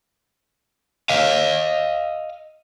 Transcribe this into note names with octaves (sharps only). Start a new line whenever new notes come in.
D#5 F5